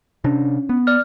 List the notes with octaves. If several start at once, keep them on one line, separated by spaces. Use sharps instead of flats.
C3 C#4 D4
B3
D5 F6